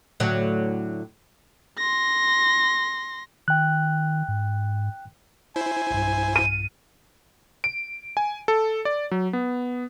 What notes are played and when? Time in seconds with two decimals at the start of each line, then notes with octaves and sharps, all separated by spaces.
0.20 A2 D3 F#3
1.78 C6 A#6
3.48 D#3 G5 F#6
4.28 G#2
5.56 E4 C5 G#5
5.91 B1 G2
6.36 D#7
7.64 D7
8.17 G#5
8.48 A4
8.85 D5
9.11 F#3
9.33 B3